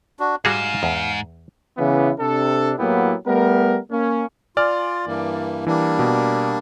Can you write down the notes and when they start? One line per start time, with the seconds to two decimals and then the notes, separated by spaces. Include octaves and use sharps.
0.19 D4 F#4
0.45 G#2 G3 F#4 G#4 F5
0.83 E2
1.77 C#3 E3 B3
2.19 C3 D4 A4
2.78 A2 F#3 A#3 B3 E4 G4
3.26 G3 A3 B3 A#4
3.90 A#3 C#4
4.57 F4 D5 G#5 F6
5.06 G2 E3 A#3
5.67 E3 G3 A#3 D4
5.99 B2